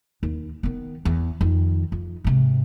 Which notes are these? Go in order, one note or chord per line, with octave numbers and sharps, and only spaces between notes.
D#2
D#3 B3
E2
F2 D#3
F2
G#2 C3